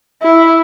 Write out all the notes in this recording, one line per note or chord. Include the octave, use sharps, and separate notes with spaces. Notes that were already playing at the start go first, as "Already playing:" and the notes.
E4